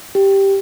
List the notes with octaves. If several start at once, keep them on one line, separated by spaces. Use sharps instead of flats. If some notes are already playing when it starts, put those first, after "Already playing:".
G4